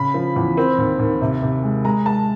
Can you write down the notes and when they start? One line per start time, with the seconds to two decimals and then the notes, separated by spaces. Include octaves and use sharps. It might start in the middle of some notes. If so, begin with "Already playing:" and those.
Already playing: C#3 B5
0.14 F3
0.36 E2
0.57 C4
0.78 D#2
0.99 D#2
1.22 C3
1.42 C3
1.63 G#3
1.85 G#3 A#5
2.06 G#3 A5